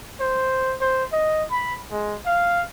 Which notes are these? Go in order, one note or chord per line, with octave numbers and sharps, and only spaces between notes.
C5
C5
D#5
B5
G#3
F5